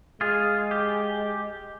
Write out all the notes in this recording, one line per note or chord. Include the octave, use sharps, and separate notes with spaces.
G#3 F4 G#4
G4